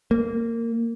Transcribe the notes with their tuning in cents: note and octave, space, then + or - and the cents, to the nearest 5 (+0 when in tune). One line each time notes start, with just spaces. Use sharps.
A#3 -15